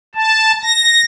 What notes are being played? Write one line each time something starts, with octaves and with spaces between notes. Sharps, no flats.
A5
A#6